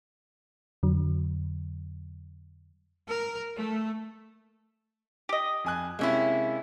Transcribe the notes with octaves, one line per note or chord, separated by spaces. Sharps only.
F2 D3 F#3
A#4
A3
G4 D#5
F2 G#5 F#6
C3 G#3 A#3 C#4 E4